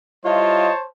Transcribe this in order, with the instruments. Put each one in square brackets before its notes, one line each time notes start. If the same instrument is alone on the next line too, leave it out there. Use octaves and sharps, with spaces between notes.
[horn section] G3 E4 F4 [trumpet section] C5 C#5 A5 [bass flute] D#5